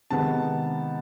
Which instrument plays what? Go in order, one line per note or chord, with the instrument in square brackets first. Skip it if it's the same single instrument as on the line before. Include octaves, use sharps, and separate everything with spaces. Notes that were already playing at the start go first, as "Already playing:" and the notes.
[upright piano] C3 D#3 G#3 B3 A5